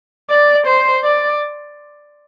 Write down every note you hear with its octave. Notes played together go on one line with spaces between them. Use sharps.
D5
C5
D5